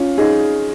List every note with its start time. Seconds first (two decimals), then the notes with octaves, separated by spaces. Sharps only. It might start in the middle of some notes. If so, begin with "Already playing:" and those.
Already playing: C#4 F4
0.18 D#4 G#4